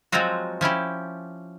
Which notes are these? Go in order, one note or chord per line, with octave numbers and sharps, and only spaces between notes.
F3 F#3 G#3 C4 F4 F#4
F3 C#4 E4 G4